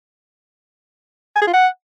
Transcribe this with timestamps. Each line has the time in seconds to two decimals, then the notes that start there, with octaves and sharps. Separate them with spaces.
1.36 G#5
1.41 G#4
1.47 F4
1.53 F#5